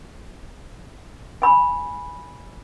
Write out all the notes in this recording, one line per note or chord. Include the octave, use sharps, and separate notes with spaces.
G#5 B5